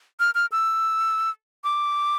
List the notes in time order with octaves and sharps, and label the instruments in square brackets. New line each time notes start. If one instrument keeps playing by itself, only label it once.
[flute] F6
F6
E6
D6